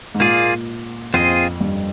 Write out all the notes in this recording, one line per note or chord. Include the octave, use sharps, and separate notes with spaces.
G#2
A#2 A#3 F4 G#4 D5
F2 C4 F4 G#4 D#5
G2